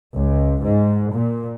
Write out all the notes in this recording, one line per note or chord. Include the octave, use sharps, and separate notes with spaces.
C#2
G#2
A#2